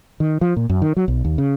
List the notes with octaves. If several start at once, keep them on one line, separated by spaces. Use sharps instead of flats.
D#3
F3
A#2
F#2
D#3
F#3
B1
D#2
C#3